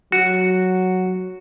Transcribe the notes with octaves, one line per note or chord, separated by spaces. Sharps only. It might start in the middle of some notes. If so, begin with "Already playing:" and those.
F#3 F#4